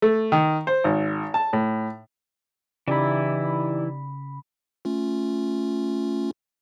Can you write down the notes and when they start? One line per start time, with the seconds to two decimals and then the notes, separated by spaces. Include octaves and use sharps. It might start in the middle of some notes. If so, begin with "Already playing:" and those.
0.02 A3
0.32 D#3
0.67 C5
0.84 G#1
1.34 A5
1.53 A2
2.88 C#3 E3 D#4 E4 G4 D5 B5
4.85 A3 C#4 F4